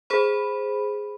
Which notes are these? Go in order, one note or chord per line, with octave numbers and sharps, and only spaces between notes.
G#4 C5 B5